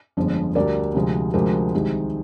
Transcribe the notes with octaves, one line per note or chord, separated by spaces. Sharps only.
G1 F2 D3 F3 G#3
D2 D3 G3 A#4 D5
D2 C3 F3 G#3
D2 C3 F3 G#3 G4 A#4
C2 C3 D#3 G#3